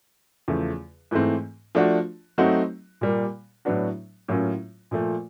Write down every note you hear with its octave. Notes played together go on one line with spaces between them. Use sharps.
E2 C#3 F3 A3
G#2 E3 A3 C4
F3 A3 D4 F#4
F#3 A3 C4 D#4 F#4
A#2 G3 A#3
A2 F#3 B3 D4 F#4
A2 F#3 A#3 C#4 F4
A#2 F3 A3